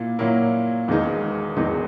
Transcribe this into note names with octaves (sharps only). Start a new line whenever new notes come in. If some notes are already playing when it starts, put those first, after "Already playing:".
Already playing: A#2 A#3 E4
A#2 F#3 A#3 E4
E1 E2 D#3 G#3 D#4
E1 E2 D#3 G#3 D#4